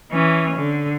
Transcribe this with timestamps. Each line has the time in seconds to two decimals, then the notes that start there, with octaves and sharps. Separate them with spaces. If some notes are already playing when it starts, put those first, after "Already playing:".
0.12 E3 C#4
0.57 D3